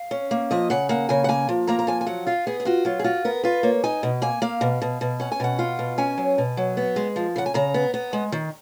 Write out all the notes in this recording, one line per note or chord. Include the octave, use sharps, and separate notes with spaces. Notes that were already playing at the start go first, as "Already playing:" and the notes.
Already playing: F5
C#4
A#3
F3 D#5
C#3 F#5
A#3 F#5
C#3 G#5
F#5
A#3 G#5
F3
A#3 A#5
A#5
F3 G#5
G#5
F#3 F#5
F4 F5
B3 G#4
G#4
F4 F#4
F#3 F4
G#4
F4 F#4
B3 A#4
F4 B4
A#3 C#5
D#4 G#5
B2
A#3 G#5
A#3 F5
B2
B2
B2
C#4 F#5
G#5
B2 F#5
F4
B2
C#4 G#5
F#3
B2
F#3
B3
G#3
F3
C#3 F#5
G#5
C#3 A#5
B3
B3
G#3
D#3